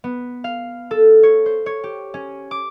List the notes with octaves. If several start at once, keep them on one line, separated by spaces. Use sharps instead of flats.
B3
F5
A4
C#5
C5
C#5
G4
C#4
D6